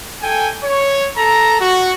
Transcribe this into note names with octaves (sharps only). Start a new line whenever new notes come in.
A4 G5 G#5
C#5
A4 A#5
F#4